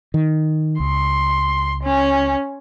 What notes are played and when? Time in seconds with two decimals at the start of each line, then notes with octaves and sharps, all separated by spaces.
0.14 D#3
0.80 C#2 C6
1.84 C#4